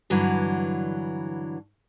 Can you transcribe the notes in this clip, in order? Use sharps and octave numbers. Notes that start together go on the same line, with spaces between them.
G2 D3 E3 F#3